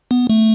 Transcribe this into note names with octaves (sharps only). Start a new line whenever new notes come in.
B3
A3